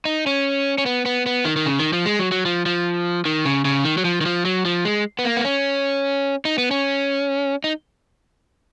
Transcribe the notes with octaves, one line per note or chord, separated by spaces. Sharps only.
D#4
C#4
C#4
B3
B3
B3
D#3
D#3
C#3
D#3
F3
G#3
F#3
F#3
F3
F3
D#3
C#3
C#3
D#3
F#3
F3
D#3
F3
F#3
F3
G#3
B3
A#3
B3
C#4
D#4
B3
C#4
D#4